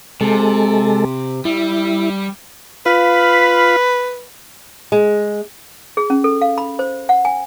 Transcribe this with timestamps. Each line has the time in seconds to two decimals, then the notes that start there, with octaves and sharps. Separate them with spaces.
0.21 C3 G#3 A4
1.45 G3 E4
2.86 F4 B4 F5 B5
4.92 G#3
5.97 G#4
6.10 C#4
6.24 A4
6.41 F5
6.58 B5
6.79 C5
7.09 F#5
7.25 G#5